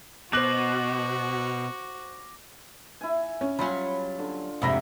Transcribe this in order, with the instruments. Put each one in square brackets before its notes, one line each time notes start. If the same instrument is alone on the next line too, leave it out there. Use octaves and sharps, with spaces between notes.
[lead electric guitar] B2 [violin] F#4 [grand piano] C5 F#6 [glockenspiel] D6 A#6 F#7
[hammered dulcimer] E4 G#5
[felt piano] C#4
[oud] F#3 G3 C#4 [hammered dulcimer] F4 [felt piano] B5
[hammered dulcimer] D3
[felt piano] F1 B5 A#6 [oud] G#2 C3 C4 [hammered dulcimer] E5